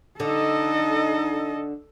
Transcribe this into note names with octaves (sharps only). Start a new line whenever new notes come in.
D3 D#4 A4 D#5